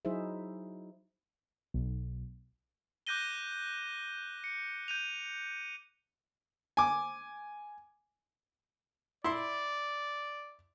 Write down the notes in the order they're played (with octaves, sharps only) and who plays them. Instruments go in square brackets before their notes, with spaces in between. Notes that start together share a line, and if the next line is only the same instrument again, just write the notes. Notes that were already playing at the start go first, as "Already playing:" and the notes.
[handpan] F#3 D#4 E4 G#4 C5 E5
[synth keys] B1
[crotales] D6 F#6 G6 A#6 D#7 G7
C#7
G6 D#7 F7
[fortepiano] G#5 D6
[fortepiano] E4 C6 [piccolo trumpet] D5